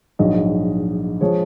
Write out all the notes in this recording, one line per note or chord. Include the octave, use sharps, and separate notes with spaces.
A#1 G#2 F#3 D#5
F3 G#3 C#5